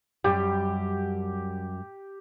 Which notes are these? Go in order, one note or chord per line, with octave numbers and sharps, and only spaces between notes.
F#2 G3 G4